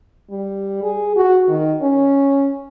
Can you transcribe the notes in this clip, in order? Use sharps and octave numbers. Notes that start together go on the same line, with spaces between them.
G3
G#4
F#4
D#3
C#4